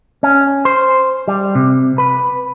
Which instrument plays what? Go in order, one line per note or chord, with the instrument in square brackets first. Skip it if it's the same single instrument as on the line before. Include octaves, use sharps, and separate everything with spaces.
[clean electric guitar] C#4
C5
G3
C3
B4